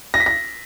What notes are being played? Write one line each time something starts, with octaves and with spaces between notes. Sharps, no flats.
A#6
B6
A#6